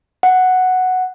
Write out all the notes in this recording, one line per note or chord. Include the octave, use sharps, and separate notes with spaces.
F#5